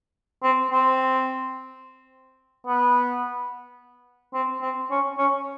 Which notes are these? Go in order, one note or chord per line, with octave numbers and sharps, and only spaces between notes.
C4
C4
B3
C4
C4
C#4
C#4